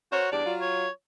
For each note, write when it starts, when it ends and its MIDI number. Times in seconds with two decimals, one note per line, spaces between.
0.12 0.31 66
0.12 0.29 70
0.12 0.29 72
0.12 0.29 73
0.32 0.43 40
0.32 0.43 55
0.32 0.43 62
0.32 0.53 74
0.45 0.86 54
0.45 0.86 65
0.61 0.90 73